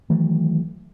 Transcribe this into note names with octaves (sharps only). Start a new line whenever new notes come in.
D#3 E3 F#3 A3